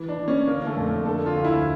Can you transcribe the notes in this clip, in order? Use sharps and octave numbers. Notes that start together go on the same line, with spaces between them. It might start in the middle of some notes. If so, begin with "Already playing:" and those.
Already playing: E3
D4
E3
C#4
D3 A#3
A#3
A3
F2
A#3
D3 A4
F4
D2
E4